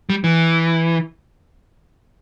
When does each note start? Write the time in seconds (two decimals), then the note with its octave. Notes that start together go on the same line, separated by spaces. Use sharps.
0.10 G3
0.24 E3